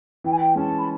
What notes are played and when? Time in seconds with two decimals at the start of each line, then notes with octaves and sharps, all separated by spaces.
0.24 E3 G5
0.32 G#5
0.39 G5
0.55 G#3 C#4 A5
0.77 B5